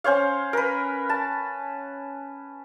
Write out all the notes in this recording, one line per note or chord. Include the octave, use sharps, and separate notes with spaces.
C#4 C5 C#5 F5
A#4 B4
A5